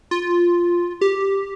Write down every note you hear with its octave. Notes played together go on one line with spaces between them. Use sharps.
F4
G4